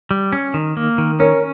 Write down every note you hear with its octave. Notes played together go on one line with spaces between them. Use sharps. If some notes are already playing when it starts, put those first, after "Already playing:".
G3
C#4
D#3
A#3
D#3
C#4 A#4 C#5